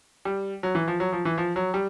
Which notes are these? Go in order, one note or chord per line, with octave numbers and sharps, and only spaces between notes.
G3
F#3
E3
F3
F#3
F3
E3
F3
F#3
G3